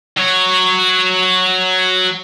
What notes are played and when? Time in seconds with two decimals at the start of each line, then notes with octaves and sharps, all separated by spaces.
0.17 F#3 C#5